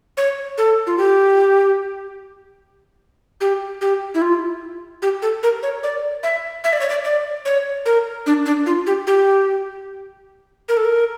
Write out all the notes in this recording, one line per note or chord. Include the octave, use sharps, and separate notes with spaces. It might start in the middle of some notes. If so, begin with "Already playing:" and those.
C#5
A4
F4
G4
G4
G4
E4
F4
G4
A4
A#4
C#5
D5
E5
E5
D5
C#5
D5
D5
C#5
A#4
D4
D4
F4
G4
G4
A#4
A4
A#4